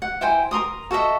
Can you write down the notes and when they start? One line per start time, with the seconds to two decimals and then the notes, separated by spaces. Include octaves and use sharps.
0.02 F#5
0.21 E4 C5 G5 G#5
0.51 A#4 A#5 C6 D#6
0.91 F#4 A4 D#5 E5